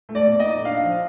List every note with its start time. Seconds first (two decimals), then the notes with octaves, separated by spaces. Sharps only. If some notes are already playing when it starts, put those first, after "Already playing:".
0.09 A3
0.15 D5
0.27 A#2
0.40 D#5
0.46 D#4
0.64 D4 F5
0.84 F3